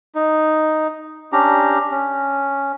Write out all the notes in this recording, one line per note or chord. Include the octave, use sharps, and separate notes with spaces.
D#4
C#4 D4 G4 A#5
C#4